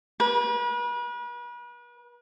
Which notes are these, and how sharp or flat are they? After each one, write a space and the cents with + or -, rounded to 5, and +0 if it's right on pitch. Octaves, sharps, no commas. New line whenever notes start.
B4 -40